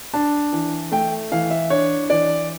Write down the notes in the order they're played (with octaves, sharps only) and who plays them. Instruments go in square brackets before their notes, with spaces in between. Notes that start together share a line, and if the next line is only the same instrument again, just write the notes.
[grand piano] D4 A5
E3
A3 G5
E3 F5
E5
D4 C#5
E3 D5